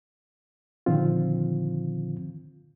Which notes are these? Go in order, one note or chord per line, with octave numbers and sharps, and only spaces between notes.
A#2 D3 D#3 F3 C4 F4